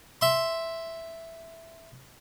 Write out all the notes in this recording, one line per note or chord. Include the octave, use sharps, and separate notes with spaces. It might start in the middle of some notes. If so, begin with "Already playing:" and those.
E5 C6